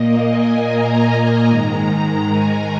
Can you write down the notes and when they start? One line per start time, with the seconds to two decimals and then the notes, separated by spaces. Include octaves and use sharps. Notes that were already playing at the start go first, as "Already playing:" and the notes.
Already playing: A#2 A#3 D#5
0.28 G#5
0.68 A#5
1.48 G#2 D#3 G#3
2.29 G#5